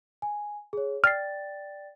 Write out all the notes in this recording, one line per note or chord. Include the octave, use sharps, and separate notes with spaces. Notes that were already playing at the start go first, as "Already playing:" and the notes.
G#5
G#4 C#5
D5 G5 F6 A6 C7